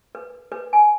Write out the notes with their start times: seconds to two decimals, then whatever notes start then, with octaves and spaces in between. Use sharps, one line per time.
0.15 B4
0.52 B4
0.73 G#5